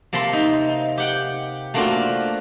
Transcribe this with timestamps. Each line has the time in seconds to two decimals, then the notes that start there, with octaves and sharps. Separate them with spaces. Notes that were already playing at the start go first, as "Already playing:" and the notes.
0.13 C3 A#3 A5 B5 C6
0.33 D#4
0.98 G4 F#5 G5
1.74 A3 A#3 C4 D4 F4 F#4